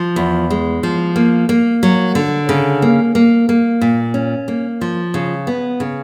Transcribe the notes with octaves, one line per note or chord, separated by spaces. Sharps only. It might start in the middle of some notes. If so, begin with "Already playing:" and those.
Already playing: F3
E2
G#3
F3
A#3
A#3
F#3
D3
C#3
A#3
A#3
A#3
A#2
C#4
A#3
F3
C#3
B3
C#3